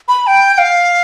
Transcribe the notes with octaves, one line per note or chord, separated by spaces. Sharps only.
B5
G5
G5
F5